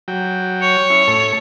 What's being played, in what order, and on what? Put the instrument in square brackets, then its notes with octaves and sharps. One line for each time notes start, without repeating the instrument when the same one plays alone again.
[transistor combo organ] F#3 G5
[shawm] C#5
[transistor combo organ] C#4 E4
A2 A4